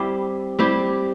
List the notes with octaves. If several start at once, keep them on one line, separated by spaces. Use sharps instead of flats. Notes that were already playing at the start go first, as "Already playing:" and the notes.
Already playing: G3 C4 E4 G4
G3 C4 E4 G4